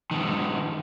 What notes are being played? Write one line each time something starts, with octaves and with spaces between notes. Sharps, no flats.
G2 D#3